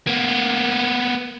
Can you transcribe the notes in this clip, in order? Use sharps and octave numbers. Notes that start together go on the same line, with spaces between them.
A#3 B3